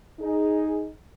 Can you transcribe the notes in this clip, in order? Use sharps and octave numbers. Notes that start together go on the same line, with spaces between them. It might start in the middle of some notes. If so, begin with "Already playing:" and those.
D#4 G#4